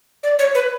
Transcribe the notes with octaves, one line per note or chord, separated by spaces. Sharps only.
D5
C#5
B4